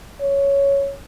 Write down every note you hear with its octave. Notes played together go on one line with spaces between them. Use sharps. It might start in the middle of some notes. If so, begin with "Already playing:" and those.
C#5